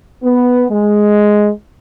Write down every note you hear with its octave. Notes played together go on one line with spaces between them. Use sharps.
B3
G#3